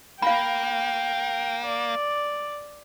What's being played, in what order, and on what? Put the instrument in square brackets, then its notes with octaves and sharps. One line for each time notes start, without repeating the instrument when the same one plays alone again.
[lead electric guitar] A#3 [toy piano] F5 B5 [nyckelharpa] G5
[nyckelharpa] D5